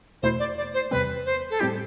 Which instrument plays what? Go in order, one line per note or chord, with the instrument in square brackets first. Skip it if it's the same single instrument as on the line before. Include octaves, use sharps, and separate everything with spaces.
[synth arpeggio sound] E2 B2 A3 E4 [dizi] C5
[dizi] D5
D5
C5
[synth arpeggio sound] E2 C3 G3 C4 [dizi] B4
[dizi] C5
A4
[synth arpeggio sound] A2 G3 C4 E4 [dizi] G4